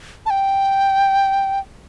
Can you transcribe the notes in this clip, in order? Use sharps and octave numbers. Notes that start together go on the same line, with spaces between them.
A5
G5